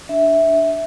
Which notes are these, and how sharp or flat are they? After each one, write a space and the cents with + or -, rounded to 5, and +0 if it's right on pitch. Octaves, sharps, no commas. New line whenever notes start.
D4 +0 E5 -10